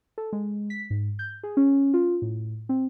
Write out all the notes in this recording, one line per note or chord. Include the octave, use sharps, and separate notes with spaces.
A4
G#3
B6
G#2
G6
G#4
C#4
F4
A2
C4